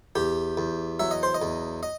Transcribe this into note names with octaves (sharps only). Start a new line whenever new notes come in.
E2 G4
E2
F#3 E5
D#5
C5
D#5
E2
D#5